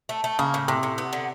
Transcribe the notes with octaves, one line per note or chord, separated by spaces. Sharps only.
A3
A3
C#3 A#3
A2
A2 C3
A2
B3
D3